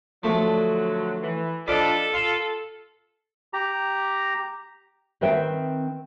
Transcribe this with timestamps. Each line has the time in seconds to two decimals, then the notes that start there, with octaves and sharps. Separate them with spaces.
0.23 D3 F3 F#3 A3
1.23 E3
1.68 F3 D4 F4 A4 D5 D#5 B5
2.14 F4 C6
3.53 G4 A#5
5.21 D#3 C4 B4 E5 G5